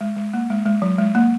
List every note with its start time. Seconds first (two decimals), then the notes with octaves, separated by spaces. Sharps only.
0.01 G#3
0.17 G#3
0.33 A#3
0.50 G#3
0.66 G#3
0.82 F#3
0.99 G#3
1.15 A#3